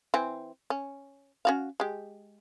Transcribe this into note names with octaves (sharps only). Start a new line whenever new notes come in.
E3 C4
C#4
C#4 F#4 F5
G#3 G4